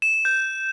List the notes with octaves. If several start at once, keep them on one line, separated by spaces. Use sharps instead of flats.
E7
E7
G6